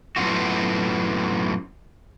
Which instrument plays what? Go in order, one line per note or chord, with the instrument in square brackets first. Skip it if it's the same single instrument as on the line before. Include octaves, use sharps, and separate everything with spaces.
[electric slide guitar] F#2 A2 B3 F4 F#4